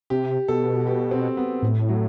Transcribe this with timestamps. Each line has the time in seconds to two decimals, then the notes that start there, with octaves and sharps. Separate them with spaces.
0.10 C3 G4
0.48 B2 A4
0.81 F#4
0.87 G4
1.11 C4
1.37 B3
1.63 A2
1.89 F#3